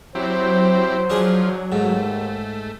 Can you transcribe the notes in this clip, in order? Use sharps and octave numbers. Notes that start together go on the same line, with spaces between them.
F#3 C4 E4 G4 C5
F3 D4 G#4
D#2 G#2 A3